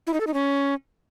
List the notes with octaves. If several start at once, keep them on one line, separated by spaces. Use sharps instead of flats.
E4
D#4
A4
D#4
C#4